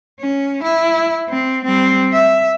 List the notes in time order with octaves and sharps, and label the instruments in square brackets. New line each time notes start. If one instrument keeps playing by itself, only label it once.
[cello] C#4
E4
C4
G3 C4
E5